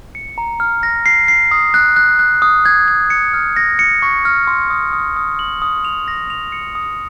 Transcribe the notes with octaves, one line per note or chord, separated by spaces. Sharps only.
C#7
A#5
F6
A#6
C7
C7
D#6
F#6
F#6
F#6
D#6
G#6
G#6
C#7
F6
A#6
C#7
C#6
F6
C6
D#6
D#6
D#6
F#7
D#6
F7
A#6
F7
C#7
D#6